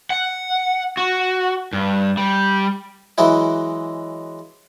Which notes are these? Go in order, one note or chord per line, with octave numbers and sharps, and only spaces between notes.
F#5
F#4
G2
G3
E3 F#3 G#3 E4